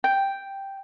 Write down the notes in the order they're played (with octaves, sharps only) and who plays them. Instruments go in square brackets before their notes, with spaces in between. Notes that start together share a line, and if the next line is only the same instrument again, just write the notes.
[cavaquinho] G5